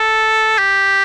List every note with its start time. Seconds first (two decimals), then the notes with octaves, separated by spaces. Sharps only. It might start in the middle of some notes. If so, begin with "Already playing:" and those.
Already playing: A4
0.59 G4